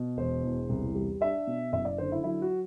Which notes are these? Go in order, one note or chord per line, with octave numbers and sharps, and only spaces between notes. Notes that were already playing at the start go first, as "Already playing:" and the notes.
Already playing: B2
E1 C5
E2
C2
G3
D4 E5
B2
F#1 E5
D5
D3 C5
E4
F#3 E4
F#4